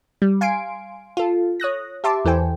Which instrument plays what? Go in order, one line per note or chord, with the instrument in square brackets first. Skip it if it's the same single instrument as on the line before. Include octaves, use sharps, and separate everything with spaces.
[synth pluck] G3
F5 G#5 C6 C7 D7
F4 A4
C#5 D#6 F#6 A#6
G4 E5 A5 C6 D6
E2 E3 A4 C5 G5 G#5